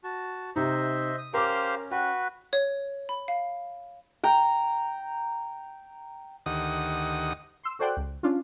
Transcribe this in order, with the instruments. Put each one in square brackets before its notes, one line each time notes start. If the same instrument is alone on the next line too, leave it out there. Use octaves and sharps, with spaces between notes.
[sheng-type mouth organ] F#4 A5
[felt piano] C3 D#4 [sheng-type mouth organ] C5 D#5 E5
[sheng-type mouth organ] D#6
[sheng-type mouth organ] C#4 [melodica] G4 C5 F5 [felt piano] A#4 D6
[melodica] F#4 B4 [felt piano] G5
[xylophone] C#5
B5
F5
[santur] G5 A#5
[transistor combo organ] D2 D#3 G4 D#5 F#5 D#6
[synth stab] C6 E6
F#4 A4 C5 D5 G5 F#6
C#2
C#4 D4 F4